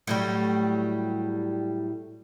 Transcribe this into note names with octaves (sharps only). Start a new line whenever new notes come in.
A2 F#3 G3